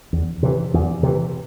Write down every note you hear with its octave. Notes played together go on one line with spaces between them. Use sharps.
E2
C3 E3
E2
C3 E3